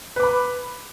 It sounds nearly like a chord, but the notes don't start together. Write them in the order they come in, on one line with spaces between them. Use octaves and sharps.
B4 D6 B5